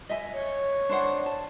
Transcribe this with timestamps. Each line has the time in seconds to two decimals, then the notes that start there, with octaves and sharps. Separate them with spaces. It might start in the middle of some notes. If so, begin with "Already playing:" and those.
0.09 D#5 E5 G#5
0.33 C#5
0.89 D4 C5 F#5
1.26 A5